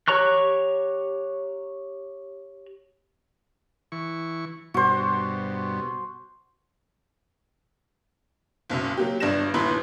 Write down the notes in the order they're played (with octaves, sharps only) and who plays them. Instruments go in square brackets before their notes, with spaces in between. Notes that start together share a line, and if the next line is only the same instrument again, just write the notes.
[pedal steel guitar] G4 C#5 A#5 C#6 F#6
[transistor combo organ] E3 C#6
[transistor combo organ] G2 B2 [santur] F#4 C5
[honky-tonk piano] F#1 B1 F#2
F#3 A#3 G4
G1 G2 D4 A#6 E7
G1 D#2 A#2 E4 B4 C6